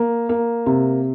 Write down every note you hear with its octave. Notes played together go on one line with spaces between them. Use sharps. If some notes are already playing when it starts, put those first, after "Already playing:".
Already playing: A#3
A#3
C3